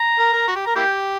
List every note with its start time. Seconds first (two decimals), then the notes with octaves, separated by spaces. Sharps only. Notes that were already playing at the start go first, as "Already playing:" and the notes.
Already playing: A#5
0.19 A#4
0.33 A#4
0.47 F#4
0.56 G4
0.65 A#4 A#5
0.75 A#3 E4 G4 G5